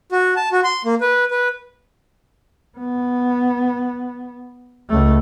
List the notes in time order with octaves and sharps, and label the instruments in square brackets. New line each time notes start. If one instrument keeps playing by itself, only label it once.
[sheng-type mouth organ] F#4
A5
F#4
C6
A#3
B4
B4
[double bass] B3
C#2 A3